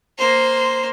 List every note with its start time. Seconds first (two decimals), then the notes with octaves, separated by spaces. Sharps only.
0.18 A#3 C5